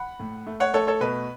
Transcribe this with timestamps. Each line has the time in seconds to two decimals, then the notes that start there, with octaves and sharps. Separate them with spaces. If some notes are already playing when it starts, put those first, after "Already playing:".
Already playing: F#5 B5
0.20 A2
0.47 A3
0.60 C#5 F#5
0.74 A3 A4 C#5
0.87 A4 C#5
1.01 B2 B4